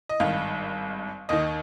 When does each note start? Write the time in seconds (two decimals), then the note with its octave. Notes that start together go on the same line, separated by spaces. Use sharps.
0.09 D#5
0.20 G#1 G2 D#3 F5
1.29 D#2 D#3 D#5